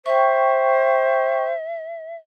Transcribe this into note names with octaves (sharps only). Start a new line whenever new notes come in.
C5 E5 G5 C#6